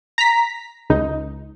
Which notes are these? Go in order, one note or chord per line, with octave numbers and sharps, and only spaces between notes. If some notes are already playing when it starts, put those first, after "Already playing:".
A#5 B6
C#2 D#4